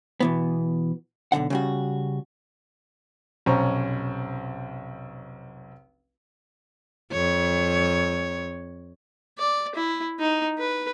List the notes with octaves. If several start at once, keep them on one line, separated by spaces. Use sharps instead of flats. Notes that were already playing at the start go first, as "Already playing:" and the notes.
B2 E3 B3
B1 E2 D3 F#5
C#3 G3 F#4
F1 B1 C#4 C5 A#5 C#6
F2 C#5
D5
E4
D#4
B4